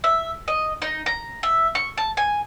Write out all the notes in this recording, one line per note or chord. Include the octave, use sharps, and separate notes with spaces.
E5
D#5
D#4
A#5
E5
C#6
A5
G#5